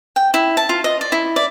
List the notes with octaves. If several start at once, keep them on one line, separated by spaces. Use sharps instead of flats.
G5
E4
A5
F4
D#5
D5
E4
D5